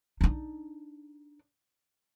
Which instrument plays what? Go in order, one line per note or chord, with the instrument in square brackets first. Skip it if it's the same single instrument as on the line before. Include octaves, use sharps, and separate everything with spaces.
[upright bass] D4 D#4